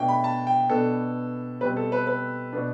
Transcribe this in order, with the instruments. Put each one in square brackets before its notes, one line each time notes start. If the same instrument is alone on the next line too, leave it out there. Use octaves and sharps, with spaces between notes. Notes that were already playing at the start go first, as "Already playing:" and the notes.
Already playing: [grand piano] B2 A3 D4 G5
B5
A5
G5
B2 B3 D4 A4
B2 G3 C4 B4
A4
B4
B4
B2 B3 D4